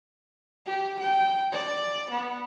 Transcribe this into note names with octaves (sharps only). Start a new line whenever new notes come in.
G4
G5
D5
B3